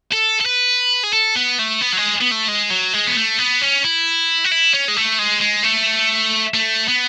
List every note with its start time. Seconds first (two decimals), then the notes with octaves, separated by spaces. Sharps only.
0.12 A4
0.40 A4
0.46 B4
1.03 G#4
1.13 A4
1.36 B3
1.59 A3
1.81 B3
1.93 F#3
1.98 G#3
2.21 B3
2.32 A3
2.49 G#3
2.70 F#3
2.93 G#3
3.07 B3
3.16 A3
3.39 B3
3.62 C#4
3.84 E4
4.44 F#4
4.51 E4
4.73 C#4
4.88 G#3
4.96 A3
5.19 G#3
5.41 G#3
5.64 A3
6.54 A3
6.88 B3